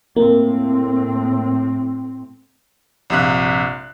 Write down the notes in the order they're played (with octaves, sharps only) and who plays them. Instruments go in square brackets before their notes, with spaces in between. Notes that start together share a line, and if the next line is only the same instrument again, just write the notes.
[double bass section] A2 C4 [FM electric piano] A#3
[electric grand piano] A#1 G2 C3 F5 F#6